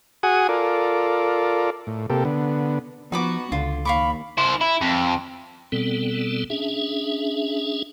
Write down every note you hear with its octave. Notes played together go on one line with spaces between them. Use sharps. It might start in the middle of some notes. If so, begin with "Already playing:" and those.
F#4 G#4 F#5 G#5 D#6
F4 A4 A#4 D5
A2
C3 A#3 G4 A4
D3 B3
F3 B3 D#4 F#4 B5 D6
C#2 D3 F4
D#2 F5 B5 C#6 D6
E4 C5
E4
F2
B2 G3 B3 C4 A4
C#4 D4 G#4 E5